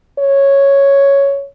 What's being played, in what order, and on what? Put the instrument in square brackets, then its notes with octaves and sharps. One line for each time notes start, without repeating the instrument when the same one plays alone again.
[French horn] C#5